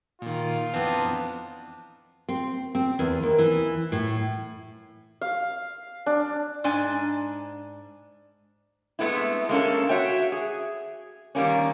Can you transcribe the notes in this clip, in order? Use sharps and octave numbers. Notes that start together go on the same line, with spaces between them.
A#2 D#3 F4
F2 E3 B3 C4 D4 D#4
C4
C4
E2
D#2
E3
A2
F5
D4
G#2 D4 G#5
G#3 A3 B3 C4 E4
G#3 A#3 C#4 A4
F#4 C#5 E5 G5
G#4
D#3 G3 A#3 C#4